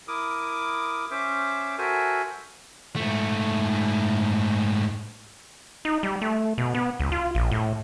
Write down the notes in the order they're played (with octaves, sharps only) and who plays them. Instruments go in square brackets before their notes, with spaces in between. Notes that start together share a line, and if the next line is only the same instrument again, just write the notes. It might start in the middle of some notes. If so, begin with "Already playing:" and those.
[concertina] E4 A#4 D6 D#6
C#4 C5 E5 D6
F#4 A4 A#4 C5 E5 G#5
[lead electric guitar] G#2 A3
[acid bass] D#4
G3
A3
B2
B3
C#2
F4
A#1
A2